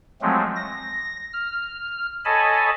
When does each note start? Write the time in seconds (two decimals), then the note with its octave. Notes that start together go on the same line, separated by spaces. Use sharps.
0.21 F3 F#3 G#3 A3 C4
0.56 A#6
1.33 F6
2.25 A4 C#5 D#5 G#5 A5 B5